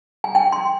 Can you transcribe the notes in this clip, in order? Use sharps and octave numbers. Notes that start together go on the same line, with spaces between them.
G#5
G5
C6